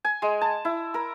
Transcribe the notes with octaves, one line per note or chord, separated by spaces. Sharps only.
G#5
G#3
A5
E4
A#4